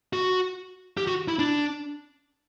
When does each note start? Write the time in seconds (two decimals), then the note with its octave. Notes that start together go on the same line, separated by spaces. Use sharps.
0.13 F#4
0.97 G4
1.07 F#4
1.28 E4
1.39 D4